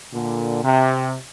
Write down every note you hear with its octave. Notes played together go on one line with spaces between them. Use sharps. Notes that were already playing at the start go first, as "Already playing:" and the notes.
A#2 D3
C3